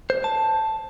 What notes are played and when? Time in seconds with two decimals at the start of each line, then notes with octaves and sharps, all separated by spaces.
0.10 C5
0.24 A5